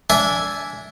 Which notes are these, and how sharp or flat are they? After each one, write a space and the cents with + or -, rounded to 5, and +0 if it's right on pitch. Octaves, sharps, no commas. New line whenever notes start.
D4 -20 E5 +0 G#5 +0